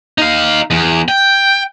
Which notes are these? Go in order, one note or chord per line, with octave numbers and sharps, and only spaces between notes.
D#4 F5
E2
G5